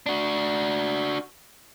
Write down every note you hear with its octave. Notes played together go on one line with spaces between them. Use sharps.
D4 F#4